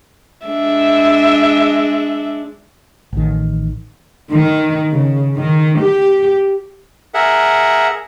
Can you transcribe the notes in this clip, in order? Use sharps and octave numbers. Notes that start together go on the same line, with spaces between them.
G#3 D4 E5
A1 D#3
D#3
C#3
D#3
G4
G#4 A#4 E5 F#5